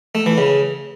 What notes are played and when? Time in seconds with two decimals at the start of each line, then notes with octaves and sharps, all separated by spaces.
0.15 A3
0.26 E3
0.38 C#3